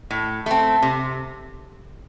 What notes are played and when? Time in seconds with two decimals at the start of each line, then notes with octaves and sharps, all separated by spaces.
0.11 A2
0.46 A3 C4
0.82 C3